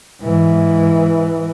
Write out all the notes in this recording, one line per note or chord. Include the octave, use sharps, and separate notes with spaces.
G#2 E3